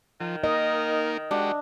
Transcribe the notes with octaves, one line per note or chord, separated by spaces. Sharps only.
D#3 F3
A#3 D#4 A#4 D#5
G#3 D4 F#4 G4